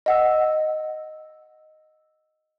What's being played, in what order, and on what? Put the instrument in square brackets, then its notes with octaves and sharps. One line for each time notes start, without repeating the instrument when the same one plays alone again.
[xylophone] D#5 F#5 E6